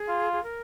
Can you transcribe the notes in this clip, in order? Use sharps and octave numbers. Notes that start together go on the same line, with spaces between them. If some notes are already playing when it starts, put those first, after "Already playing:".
Already playing: G#4
F4
G#4
A#4